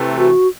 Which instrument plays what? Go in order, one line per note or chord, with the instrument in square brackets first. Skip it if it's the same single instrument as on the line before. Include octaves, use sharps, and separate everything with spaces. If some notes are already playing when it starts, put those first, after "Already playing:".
Already playing: [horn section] C3 E3 A3
[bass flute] F#4